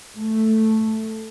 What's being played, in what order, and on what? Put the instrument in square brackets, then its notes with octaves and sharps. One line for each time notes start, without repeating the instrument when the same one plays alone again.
[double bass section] A3